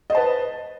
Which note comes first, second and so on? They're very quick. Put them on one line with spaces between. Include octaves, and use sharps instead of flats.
D#5 C5 A5 B4